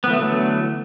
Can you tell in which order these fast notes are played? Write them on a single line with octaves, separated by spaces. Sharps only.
B3 E3 A3 F#3 D3